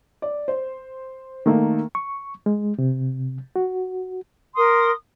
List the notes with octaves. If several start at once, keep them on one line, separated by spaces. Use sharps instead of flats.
D5
C5
D#3 A3 A#3
C#6
G#3
C3
F#4
A#4 C6 D#6